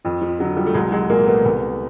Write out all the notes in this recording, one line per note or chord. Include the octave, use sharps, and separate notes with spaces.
F2 F3
F3
D3 F3 F#3
F3 G3
A3
C2 F#3 G#3
F#3 G#3
A#2 F3 G#3 A#3
A3 B3
C2